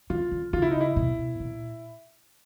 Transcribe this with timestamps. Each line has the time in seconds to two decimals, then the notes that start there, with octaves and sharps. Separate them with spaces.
0.10 D3 F4
0.31 D3
0.53 C#3 F4
0.62 E4
0.71 D#4
0.81 E4
0.96 B2
1.40 A#2